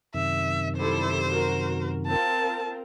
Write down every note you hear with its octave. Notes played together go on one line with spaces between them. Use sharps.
F#2 C3 D#3 E5
G3 E4 A4 C5
F#4 A#4
C4 F4 A#4 A5